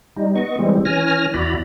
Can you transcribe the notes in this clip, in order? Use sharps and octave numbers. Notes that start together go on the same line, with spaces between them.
G3 D#4
B3 D#5 C#6
E3 G3 G#3 C4
E3 C#4 G#5 F6 A#6
E2 E4 F#4 D5 A#5 B5